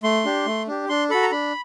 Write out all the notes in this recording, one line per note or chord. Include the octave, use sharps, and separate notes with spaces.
A3 C6
D4 G4
A3
D4 G4
D4 C6
F#4 A4 B5
A#5
D4 B5